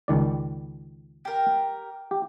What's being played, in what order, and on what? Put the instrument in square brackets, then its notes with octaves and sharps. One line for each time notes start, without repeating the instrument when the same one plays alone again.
[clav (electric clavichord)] C#2 D#3 D5
[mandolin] G4 A#4
[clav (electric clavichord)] G4